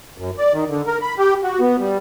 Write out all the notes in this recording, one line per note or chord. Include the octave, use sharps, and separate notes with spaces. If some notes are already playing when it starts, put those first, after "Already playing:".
F#2
D5
D#3
D3
A#4
B5
G4
F#4
B3
G3